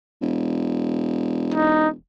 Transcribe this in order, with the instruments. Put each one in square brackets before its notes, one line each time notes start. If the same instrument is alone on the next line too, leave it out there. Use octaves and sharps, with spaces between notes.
[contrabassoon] E1
[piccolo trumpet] D#4